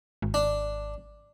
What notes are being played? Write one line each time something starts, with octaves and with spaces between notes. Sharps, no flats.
G#1
D4